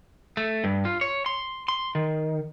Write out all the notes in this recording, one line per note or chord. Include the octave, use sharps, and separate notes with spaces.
A3
G2
F4
C#5
C6
C6
D#3